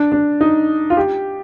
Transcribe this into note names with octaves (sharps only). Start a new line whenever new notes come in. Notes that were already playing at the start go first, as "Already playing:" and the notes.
Already playing: D4
D4
D#4
F4
G4